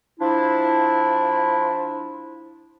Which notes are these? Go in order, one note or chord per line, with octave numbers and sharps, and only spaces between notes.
F3 D4 E4